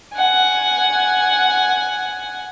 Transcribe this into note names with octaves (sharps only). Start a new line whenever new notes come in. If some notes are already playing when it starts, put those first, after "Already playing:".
F#5 G#5